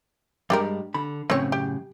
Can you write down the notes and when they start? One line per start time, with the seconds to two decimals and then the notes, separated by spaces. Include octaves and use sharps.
0.50 G2 G3 G#3 D4 G4 A#4
0.94 D3 B5
1.30 F#2 A2 C#3 C4 C#5
1.52 G4